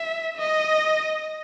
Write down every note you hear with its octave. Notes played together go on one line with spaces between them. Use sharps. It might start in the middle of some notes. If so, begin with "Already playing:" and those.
Already playing: E5
D#5